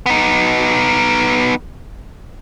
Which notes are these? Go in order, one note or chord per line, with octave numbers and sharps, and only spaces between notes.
B3 D#4